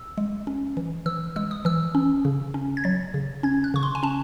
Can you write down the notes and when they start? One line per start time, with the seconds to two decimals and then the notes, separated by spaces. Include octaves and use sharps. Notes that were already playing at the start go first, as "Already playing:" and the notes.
Already playing: E6
0.18 G#3
0.47 C#4
0.77 E3
1.06 E3 E6
1.36 G#3 E6
1.51 D#6
1.65 E3 E6
1.95 C#4
2.25 C#3
2.54 C#4
2.77 G#6
2.84 F#3 A6
3.14 C#3
3.43 C#4 G#6
3.64 F#6
3.74 C#3 C#6
3.83 C6
3.95 G#5
4.03 C#4 A5